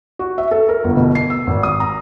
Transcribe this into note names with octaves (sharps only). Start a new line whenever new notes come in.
F#4
E5
A4
A#4
G1
B2
C7
E6
G#1
D#6
A#5